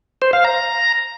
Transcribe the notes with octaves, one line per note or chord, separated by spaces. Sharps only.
C5
F5
A#5